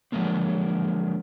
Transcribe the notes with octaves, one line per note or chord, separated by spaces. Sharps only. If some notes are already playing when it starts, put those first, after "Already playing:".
D3 F3 F#3 G#3 A#3 C4